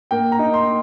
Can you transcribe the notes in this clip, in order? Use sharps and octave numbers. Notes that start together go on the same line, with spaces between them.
A#3 G5
A#5
D#4
C6